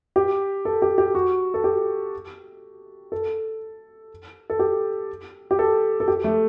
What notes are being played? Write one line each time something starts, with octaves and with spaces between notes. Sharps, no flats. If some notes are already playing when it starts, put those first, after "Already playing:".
G4
A4
G4
G4
F#4
A4
G4
A4
A4
G4
G4
A4
A4
G4
A3